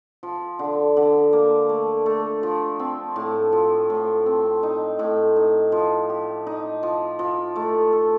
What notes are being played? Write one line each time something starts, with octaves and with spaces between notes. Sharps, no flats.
F3
D3
D3
A#3
A3
A3
F3
C4
A2
F3
A2
C4
D#4
A2
D#4
F3
G4
D#4
F3
F3
A3
A4